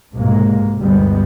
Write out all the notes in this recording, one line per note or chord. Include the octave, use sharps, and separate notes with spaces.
B1 G#2 C3 G#3 A#3
G1 D2 G3 G#3 B3